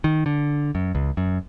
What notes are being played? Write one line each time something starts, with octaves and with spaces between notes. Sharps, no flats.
D#3
D3
F#2
C#2
F#2